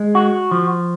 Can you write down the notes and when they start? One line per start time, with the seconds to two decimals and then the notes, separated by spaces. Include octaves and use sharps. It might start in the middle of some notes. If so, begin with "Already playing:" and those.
Already playing: G#3
0.15 F#4
0.51 F3